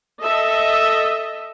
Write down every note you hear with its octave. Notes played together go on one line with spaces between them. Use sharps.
A4 D#5 E5